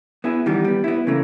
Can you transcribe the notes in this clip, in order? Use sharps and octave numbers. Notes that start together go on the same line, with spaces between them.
B3 E4 G#4
D#3 E3 G3 B3
G3 B3
B3 E4
C#3 E3 A3 A#3